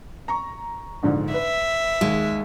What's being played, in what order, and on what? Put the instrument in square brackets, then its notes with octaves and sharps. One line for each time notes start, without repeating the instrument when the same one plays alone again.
[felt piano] A#5 C#6
A#1 G#2 D3
[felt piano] B4 [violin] E5
[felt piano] D#2 [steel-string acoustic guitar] G#3